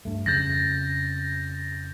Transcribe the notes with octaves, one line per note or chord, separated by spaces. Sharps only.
G2 A3
F2 C#3 G6 A6 A#6